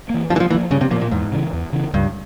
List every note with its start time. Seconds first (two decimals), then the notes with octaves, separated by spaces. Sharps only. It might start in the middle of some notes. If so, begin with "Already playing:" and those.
0.10 E3 A#3
0.30 G2 F3
0.36 E3
0.40 F3
0.51 E3 F3 A#3
0.70 G2 C#3
0.81 C3
0.91 A#2 F3
0.96 A#3
1.01 A#2
1.11 E2 G#2
1.32 C#3 E3
1.53 E2
1.73 C#3 E3
1.93 C#2 G2